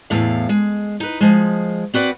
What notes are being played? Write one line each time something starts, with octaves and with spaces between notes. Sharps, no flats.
E2 A2 F5
G#3
D#4 B4
F3 G#3
C4 F#4 B4 D5